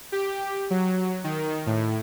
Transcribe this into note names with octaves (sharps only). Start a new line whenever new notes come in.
G4
F#3
D#3
A2